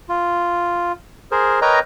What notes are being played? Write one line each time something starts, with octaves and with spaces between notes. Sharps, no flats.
F4
G#4 A#4 C5
A#4 B4 C#5 D#5 G5 A#5